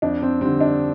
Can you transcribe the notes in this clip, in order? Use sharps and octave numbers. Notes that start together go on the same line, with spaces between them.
F2 D4
C4
D3 G3 C4
D4